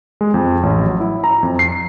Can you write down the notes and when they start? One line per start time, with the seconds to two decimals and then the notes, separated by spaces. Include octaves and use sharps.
0.21 G#3
0.34 F2
0.63 A1
0.86 F#3
1.00 E4
1.24 A#5
1.43 F2
1.59 C7